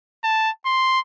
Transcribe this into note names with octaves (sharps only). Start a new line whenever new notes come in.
A5
C6